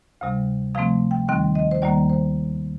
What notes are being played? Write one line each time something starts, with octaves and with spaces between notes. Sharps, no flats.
D2 C3 G3
C3 F3 A3 C4 F5
G5
D#2 D#3 G3 C4 G5
D#5
C5
D#2 D#3 G3 A#3 D5
C5